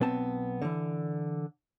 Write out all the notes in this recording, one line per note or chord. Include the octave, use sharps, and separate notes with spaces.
B1 B3 C4 A5
D3 E3